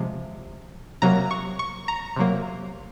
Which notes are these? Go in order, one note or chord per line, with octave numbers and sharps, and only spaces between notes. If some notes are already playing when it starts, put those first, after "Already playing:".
Already playing: C3 F3 G#3
C3 F#3 A#3 A#5
C#6
C#6
A#5
C3 F#3 A#3